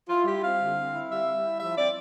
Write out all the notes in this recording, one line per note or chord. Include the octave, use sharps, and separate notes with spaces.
E4 F4
G3 G4
C4 F5
D3
C4
E4
G3 E5
G3
E4
F3 E5
C4 D5